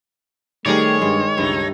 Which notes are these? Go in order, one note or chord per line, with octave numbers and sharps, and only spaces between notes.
D#3 G3 A3 G#4 A#4 C#5 D5
G2 G#3
C#2 G2 A3 D#4